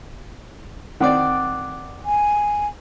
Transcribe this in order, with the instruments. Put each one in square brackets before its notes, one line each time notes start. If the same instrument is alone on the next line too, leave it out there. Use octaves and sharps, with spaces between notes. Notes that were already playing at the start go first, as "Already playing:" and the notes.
[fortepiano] D#3 C4 D5 [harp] F#5 D6
[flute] G#5